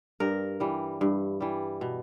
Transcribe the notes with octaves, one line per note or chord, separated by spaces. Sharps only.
G2 A#4
E3 G3
G2
E3 G3
B2